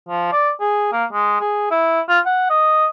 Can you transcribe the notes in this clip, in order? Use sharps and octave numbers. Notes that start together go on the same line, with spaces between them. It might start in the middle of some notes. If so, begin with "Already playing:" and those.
F3
D5
G#4
A#3
G#3
G#4
E4
F4
F#5
D#5